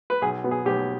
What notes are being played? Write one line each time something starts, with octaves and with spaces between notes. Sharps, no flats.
B4
B1 G#4
B2 B3
G#4
B1 G4